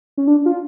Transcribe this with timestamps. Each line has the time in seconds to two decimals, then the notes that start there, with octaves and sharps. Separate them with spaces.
0.17 C#4
0.28 D4
0.46 F4